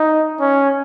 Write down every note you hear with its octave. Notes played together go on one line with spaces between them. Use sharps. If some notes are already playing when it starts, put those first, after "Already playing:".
Already playing: D#4
C#4